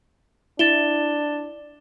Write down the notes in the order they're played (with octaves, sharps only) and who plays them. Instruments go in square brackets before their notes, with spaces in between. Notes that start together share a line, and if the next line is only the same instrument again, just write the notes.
[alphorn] D4 [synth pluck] E4 [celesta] A6 E7 G7